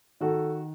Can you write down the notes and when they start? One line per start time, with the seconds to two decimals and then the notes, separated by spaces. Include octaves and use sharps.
0.21 D#3 F#4 A4